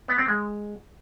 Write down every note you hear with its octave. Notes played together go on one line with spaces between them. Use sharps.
B3
C4
G#3